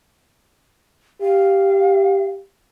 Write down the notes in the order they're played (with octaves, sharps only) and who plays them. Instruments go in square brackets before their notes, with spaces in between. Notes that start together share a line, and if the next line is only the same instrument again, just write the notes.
[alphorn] G4 [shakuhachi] F5